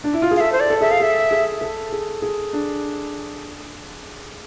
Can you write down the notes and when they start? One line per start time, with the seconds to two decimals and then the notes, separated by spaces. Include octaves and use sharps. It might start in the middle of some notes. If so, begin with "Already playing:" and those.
0.04 D4
0.13 E4
0.22 F4
0.31 G#4
0.36 F5
0.40 A4 E5
0.52 C5
0.60 D5
0.70 A4
0.81 G#4 E5
0.90 A4 F5
1.00 G#4 E5
1.31 G#4
1.61 A4
1.92 G#4
2.22 G#4
2.53 D4